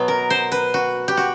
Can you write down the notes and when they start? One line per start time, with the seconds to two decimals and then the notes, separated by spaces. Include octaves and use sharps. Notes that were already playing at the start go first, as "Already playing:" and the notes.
Already playing: B2 F#3 B3
0.08 A#4
0.30 C5
0.52 B4
0.74 F#4
1.08 G4
1.17 F#4